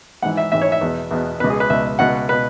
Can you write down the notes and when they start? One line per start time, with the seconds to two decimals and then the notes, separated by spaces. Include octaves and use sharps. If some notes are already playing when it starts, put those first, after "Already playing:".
0.22 G#1 G#2 E3 F#5
0.37 E5
0.52 G#1 G#2 E3 E5
0.62 C#5
0.72 E5
0.81 E2 B2
1.11 E2 B2
1.40 C#2 B2 B4
1.50 G#4
1.60 B4
1.70 C#2 B2 E5
1.99 C#2 B2 F#5
2.29 B4
2.33 B2